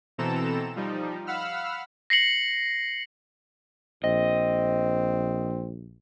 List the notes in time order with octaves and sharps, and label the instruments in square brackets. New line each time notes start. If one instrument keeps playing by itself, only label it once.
[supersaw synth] B2 E3 C4 A4 A#5 E7
F3 G3 D#4
F5 F#5 B5 E6 F6
[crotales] A#6 C7 C#7 F#7
[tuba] A#1 [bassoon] C4 [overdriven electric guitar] D#5